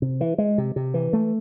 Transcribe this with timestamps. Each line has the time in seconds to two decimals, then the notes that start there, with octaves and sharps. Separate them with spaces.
0.02 C3
0.21 E3
0.38 G#3
0.58 C3
0.76 C3
0.94 E3
1.13 A3